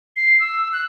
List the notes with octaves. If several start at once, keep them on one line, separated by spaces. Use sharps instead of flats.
C7
E6
F#6